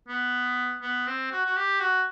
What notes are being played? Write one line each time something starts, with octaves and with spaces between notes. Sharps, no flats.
B3
B3
C4
F#4
F#4
G4
F#4